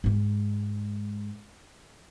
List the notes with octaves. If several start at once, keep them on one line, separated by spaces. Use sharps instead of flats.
G#2 G#3